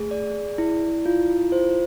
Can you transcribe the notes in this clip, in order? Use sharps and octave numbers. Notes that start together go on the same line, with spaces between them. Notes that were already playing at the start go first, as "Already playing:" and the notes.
Already playing: A3 G#4
D5
E4
F4
C5